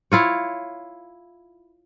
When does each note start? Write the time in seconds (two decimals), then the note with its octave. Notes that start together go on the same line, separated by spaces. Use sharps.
0.12 E4 F4 C#5